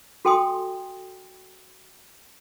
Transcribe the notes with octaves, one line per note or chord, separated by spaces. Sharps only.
F#4 A4 G5 G#5 C6 D#6